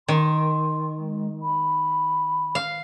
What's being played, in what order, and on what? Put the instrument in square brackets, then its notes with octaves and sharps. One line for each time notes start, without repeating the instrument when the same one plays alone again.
[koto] D#3 [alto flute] C6
[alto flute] G#3
B5
[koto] F5